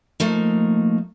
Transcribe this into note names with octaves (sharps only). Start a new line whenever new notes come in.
F3 A3 A#3 D#4